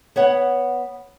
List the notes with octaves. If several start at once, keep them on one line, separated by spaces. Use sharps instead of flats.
B3 C#5 F#5